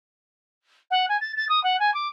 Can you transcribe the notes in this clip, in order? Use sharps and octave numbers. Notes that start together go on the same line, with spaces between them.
F#5
G#5
A6
A6
D#6
F#5
G#5
D6